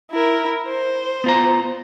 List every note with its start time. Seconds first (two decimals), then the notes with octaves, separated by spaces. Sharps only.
0.11 E4 A#4
0.68 C5
1.24 B3 F4 A#5